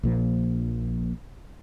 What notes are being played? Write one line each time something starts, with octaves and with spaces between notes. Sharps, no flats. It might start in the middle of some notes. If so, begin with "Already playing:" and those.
A#1 A#2 F3